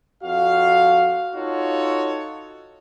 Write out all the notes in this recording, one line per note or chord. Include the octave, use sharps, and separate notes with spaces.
F2 F#4 F5
D#4 F4 F#4 A4 C#5